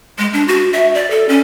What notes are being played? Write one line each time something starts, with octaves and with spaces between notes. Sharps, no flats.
G#3
D4
F#4
E5
D5
A4
C#4